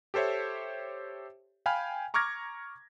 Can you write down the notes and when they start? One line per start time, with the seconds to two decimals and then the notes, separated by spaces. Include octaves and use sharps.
0.14 G4 A4 C5 C#5 E5
1.66 F5 G5 G#5 B5 F6
2.14 A#5 C#6 D6 F6 G#6 A#6